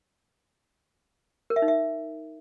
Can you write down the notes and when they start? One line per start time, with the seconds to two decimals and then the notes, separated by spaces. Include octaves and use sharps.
1.50 A#4
1.56 E5
1.62 D#4
1.68 E5